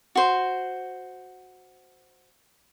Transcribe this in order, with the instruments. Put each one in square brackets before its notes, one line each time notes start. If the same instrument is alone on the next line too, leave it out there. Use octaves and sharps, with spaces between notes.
[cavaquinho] F#4 C5